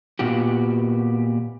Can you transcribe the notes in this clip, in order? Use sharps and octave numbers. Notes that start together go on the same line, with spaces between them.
A#2 B3 F#4 G4